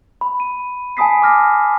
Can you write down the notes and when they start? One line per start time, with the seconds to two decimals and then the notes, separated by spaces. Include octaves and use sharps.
0.21 B5
0.40 D#7
0.97 G#5 A5 B5 D#6 B6 C7
1.22 D6 F6 A#6